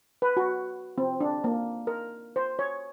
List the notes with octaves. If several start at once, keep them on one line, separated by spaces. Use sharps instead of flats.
B4
F#4
C4
D4
A#3
A#4
C5
C#5